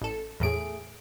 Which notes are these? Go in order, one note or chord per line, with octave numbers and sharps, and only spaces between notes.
A1 A4
E2 A2 A3 G#4 D7